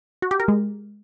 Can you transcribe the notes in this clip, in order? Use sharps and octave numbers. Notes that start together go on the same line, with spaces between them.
F#4
G4
A#4
G#3